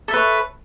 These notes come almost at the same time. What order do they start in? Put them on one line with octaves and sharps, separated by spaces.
A4 E5 B4 C#5